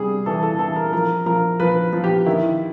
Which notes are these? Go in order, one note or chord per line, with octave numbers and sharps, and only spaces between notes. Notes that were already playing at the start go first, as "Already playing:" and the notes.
Already playing: C3 G3 G#4
E3 A4
A4
E3 A4
A#4
F3 A#4
F3 A#4
F3 B4
F3
G4
D#3 E4